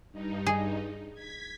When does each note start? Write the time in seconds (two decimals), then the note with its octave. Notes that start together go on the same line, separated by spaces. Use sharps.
0.12 G2 D#4
0.47 G#4
1.14 G#6 B6